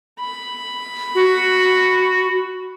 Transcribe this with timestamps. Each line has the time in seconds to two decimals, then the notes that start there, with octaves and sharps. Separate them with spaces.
0.20 B5
1.15 F#4